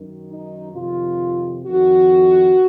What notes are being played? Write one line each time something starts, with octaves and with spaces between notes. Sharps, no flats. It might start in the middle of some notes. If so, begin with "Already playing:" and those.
Already playing: F#2 D#3
D#4
F2 C3 D#3 F4
F2 D#3 F#4